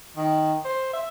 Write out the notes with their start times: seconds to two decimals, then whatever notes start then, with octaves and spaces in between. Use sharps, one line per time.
0.17 D#3
0.65 C5
0.93 E5